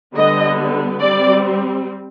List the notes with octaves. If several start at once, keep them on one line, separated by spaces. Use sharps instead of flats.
D3 G3 B3 D#5
G3 C4 D5